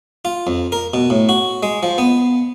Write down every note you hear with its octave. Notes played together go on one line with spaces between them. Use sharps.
F4
F2
A#4
B2
A2
F#4
G#3
F3
B3